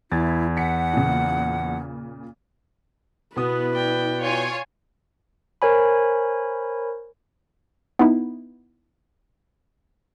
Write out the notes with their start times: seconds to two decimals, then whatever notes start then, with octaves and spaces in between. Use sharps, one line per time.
0.12 E2 E4 G#6 A6
0.56 F#5 G#5 B6 C#7
0.93 A#2 C#3
3.36 B2 B3 E4 B4 D#6
3.75 D5 G5
4.21 F4 C#5 G#5
5.62 A#4 C5 C#5 G#5 B5
7.99 B3 D#4 E4